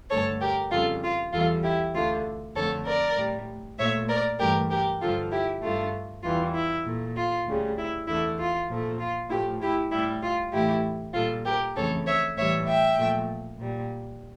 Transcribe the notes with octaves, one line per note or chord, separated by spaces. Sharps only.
G2 D3 A3 A4 C#5
G4 A#4
F2 C#3 G3 F4 A4
F4
E2 E3 G3 F4 A4
E4 G4
D2 D3 A3 F4
F2 D3 F3 A3 A4 C#5
A#4 D5
A2 G3
A#2 A3 C#5 E5
A#4 D5
G2 E3 A3 G4 A#4
G4 A#4
G2 D3 F3 F4 A4
E4 G4
G2 D3 A3 F4
E2 E3 G3 F4
E4
A#2 A3
F4
D2 C#3 G3
E4
E2 D3 A3 E4
F4
A#2 F3 A3
F4
A2 F3 A3 E4 G4
E4 G4
A2 G3 E4
F4
A2 E3 A3 E4 G4
A#2 G3 F4 A4
G4 A#4
F2 C#3 E3 A3 A4 C#5
C#5 E5
A2 E3 G3 C#5 E5
E5 G5
A#2 F3 A3
A#2 G3